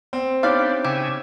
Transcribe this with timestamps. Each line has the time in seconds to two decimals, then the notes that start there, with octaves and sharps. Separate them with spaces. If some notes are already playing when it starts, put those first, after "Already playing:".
0.13 C4
0.43 B3 D4 D#4 G4 C#5 D5 F5 D6
0.84 C#3 G4 E5 G#5